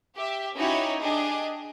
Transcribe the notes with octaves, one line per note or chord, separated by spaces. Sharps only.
G4 E5
C#4 D#4 E4 F#4 G4 C#5
D4 G4 G#4 D#5